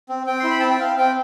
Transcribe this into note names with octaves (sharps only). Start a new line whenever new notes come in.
C4
C4 G5
E4 C6
B5
C4 A5
G5
C4 F5
C4 G5